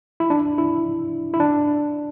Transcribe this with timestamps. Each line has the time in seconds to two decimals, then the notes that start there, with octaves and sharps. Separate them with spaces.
0.20 E4
0.30 D4
0.58 E4
1.34 E4
1.40 D4